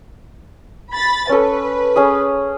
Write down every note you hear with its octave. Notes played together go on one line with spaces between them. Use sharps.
B5 A6
C#4 A4 B4
C#4 G#4 D#6